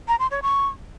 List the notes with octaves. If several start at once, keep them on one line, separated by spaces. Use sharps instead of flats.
A#5
C6
C#5
C#6